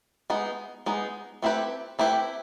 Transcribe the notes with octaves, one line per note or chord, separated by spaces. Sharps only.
G#3 B3 D#4
G#3 B3 D#4
A3 C4 E4 G4 B4
A3 C4 E4 G4 B4